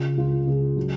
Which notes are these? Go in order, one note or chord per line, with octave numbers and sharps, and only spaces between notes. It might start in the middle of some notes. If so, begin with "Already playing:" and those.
Already playing: C#3 F4
C#2 F4
C#2 G#4
F#3